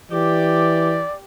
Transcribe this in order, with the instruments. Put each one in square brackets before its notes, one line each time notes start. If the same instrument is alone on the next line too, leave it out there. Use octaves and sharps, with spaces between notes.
[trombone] E3 [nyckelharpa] G4 [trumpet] D5